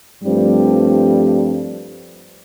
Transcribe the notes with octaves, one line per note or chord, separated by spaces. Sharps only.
G2 F3 G3 A3 C4